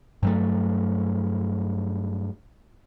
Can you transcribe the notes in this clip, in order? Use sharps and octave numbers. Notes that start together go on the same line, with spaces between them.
G2 F#3 A3